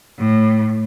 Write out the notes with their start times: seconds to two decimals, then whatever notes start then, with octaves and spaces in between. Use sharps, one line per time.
0.19 A2